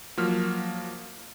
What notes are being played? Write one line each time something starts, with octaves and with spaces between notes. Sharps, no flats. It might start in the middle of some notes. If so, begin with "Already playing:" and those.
F3 F#3 A#3 F6